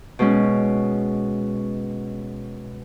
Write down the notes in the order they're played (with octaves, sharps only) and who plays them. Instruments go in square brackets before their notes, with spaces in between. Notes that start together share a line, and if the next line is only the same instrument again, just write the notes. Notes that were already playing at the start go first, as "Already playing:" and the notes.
[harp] B2 G#3 C#4